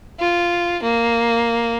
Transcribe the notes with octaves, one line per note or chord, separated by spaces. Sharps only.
F4
A#3